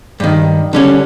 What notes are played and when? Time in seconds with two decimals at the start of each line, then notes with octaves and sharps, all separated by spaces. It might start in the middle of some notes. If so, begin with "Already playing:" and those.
0.20 G2 D#3
0.73 D3 G3 C#4